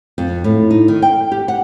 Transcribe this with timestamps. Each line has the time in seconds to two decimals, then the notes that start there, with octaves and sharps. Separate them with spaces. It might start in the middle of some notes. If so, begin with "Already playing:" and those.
0.18 F2
0.44 A2
0.70 D#4
0.88 D#3
1.02 G5
1.32 G4
1.48 F#5